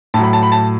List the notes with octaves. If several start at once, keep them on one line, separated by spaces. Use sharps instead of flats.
A2 F#3 A5 B5
A5
B5
A5